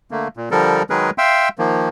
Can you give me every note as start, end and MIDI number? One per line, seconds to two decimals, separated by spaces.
0.11 0.28 50
0.11 0.28 57
0.11 0.28 58
0.37 0.49 46
0.51 0.83 50
0.51 0.83 53
0.51 0.83 55
0.51 0.83 69
0.51 0.83 70
0.90 1.10 51
0.90 1.10 54
0.90 1.10 56
0.90 1.10 68
0.90 1.10 70
0.90 1.10 71
1.18 1.49 76
1.18 1.49 77
1.18 1.49 79
1.18 1.49 84
1.18 1.49 88
1.59 1.89 51
1.59 1.89 53
1.59 1.89 58